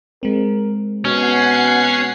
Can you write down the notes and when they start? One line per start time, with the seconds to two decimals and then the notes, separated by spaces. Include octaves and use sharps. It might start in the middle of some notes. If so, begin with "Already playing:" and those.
0.23 G#3 C4 A#4
1.05 B2 C#4 F#5 C7